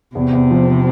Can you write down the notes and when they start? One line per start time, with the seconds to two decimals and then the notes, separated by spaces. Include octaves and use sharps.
0.15 E2 C3
0.33 E2
0.51 F3